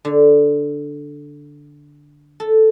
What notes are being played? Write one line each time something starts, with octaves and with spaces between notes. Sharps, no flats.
D3
A4